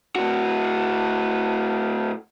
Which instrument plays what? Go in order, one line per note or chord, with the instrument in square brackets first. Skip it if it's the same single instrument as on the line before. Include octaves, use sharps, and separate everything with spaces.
[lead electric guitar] A2 F#4